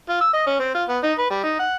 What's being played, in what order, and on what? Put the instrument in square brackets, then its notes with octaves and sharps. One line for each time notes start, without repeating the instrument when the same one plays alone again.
[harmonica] F4
E6
D#5
C#4
C4
F4
B3
D#4
B4
G3
D#4
F#5